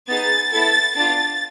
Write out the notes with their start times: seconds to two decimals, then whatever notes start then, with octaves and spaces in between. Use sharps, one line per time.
0.08 B3 D#4 G#4 A6
0.52 B3 E4 A4 A6
0.94 B3 D4 F4 A6